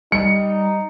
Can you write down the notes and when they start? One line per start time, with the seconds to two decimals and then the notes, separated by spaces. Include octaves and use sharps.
0.12 G3 D#4 C#7